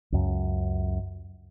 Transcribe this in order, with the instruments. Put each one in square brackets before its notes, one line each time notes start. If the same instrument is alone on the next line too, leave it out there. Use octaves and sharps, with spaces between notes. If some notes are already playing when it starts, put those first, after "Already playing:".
[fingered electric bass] C#2 F#2